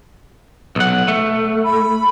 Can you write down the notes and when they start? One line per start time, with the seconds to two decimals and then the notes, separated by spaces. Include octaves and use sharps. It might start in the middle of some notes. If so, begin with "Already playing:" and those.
0.76 B1 F#5
1.08 A3
1.65 B5